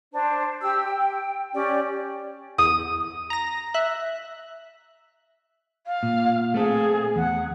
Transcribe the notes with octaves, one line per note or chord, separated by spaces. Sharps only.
D4 C5
G4 E6
G5
C#4 G4 D5
E2 D#6
A#5 A#6
E5 F#6
F5
A#2
A3 C4 G#4 A4
E2 F#5